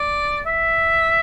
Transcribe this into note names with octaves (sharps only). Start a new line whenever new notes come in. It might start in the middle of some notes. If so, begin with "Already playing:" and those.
Already playing: D5
E5